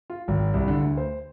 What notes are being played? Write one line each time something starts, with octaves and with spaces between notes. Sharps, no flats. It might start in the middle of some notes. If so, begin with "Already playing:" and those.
F4
G#1
C2
D3
D2
C5